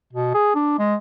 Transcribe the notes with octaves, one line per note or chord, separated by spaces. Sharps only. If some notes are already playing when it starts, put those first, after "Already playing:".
B2
G#4
D4
G#3